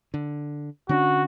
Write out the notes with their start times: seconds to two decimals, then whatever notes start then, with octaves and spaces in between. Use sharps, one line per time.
0.14 D3
0.89 D3 C#4 D4 F#4